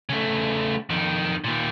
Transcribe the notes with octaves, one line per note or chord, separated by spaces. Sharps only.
C#3 A3
F2 D#3
A#2 D#3